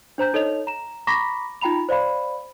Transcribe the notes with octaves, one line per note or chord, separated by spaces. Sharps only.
D4 C5 A#5 G6
D#4 A4 C#5 D#5 F7
A#5 E7
A#5 B5 C#6 D6 A#6 B6
D#4 F4 G5 A#5 B5 F7
C5 D5 F5 B5